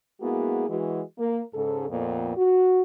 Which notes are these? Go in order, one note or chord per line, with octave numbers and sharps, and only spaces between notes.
G#3 A#3 B3 E4 F#4 G#4
E3 G#3 F#4
A#3
G#2 C#3 A4
F2 A#2 B3
F#4